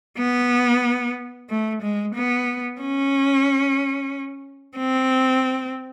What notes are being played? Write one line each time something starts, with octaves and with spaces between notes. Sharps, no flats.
B3
A3
G#3
B3
C#4
C4